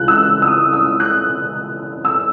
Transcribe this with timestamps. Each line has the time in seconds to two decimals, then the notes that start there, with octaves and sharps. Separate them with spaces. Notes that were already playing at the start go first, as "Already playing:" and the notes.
Already playing: C#2 E3 F#6
0.08 E6
0.42 E6
0.47 D#6
0.73 E6
1.00 F#6
2.05 E6